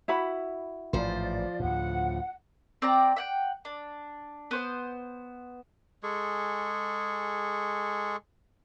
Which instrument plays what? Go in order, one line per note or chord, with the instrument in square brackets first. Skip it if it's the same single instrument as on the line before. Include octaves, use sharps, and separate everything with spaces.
[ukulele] E4 F#4 B5
[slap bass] A1 G#2 [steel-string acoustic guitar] F3 C5 [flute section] D5
[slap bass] D2 A2 [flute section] F#5
[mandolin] C4 D5 G5 A#5
E5 F#5 G5
D4
B3 C5 C6
[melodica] G#3 G#4 A4 C#6